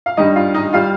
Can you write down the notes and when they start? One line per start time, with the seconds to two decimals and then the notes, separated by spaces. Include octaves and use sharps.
0.06 F5
0.17 G2 G3 D#4 D#5
0.36 F4 F5
0.54 D#4 D#5
0.73 G3 F4 F5